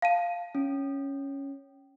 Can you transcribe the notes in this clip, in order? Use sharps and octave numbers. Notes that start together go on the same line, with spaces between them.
F5 A5 D#7
C#4